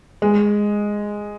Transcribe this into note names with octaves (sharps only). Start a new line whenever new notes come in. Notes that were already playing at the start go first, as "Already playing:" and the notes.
G#3